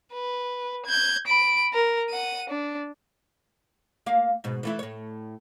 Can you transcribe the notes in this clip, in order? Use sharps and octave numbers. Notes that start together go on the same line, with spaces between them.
B4
G6 G#6
B5 D7
A#4
F#5 D#7
D4
A#3 F5
G#2 B2
E3 A3 E4
A2 C#5